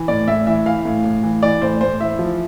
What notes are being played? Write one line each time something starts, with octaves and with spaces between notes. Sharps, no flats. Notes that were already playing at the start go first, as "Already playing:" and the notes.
Already playing: E3
A2 D5
A2 E5
E3 E5
E3 F5
A2
A2
E3
E3 D5
A2 C5
A2 C5
E3 E5
F3